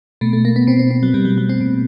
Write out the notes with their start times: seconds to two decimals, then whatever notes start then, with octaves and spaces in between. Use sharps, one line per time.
0.21 B2 A3
0.33 A3
0.45 A#3
0.56 B3
0.67 B2 C4
0.79 C4
0.91 C4
1.03 F#3
1.14 B2 G3
1.25 F#3
1.38 F#3
1.49 C4
1.61 B2